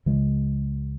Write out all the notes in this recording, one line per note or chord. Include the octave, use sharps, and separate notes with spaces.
C#2 C#3 F3 G#3